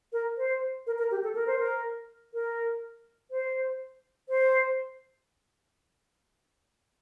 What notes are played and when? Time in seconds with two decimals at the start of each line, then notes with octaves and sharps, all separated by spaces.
0.13 A#4
0.38 C5
0.87 A#4
0.98 A#4
1.11 G4
1.24 A4
1.35 A#4
1.47 C5
1.59 A#4
2.34 A#4
3.31 C5
4.29 C5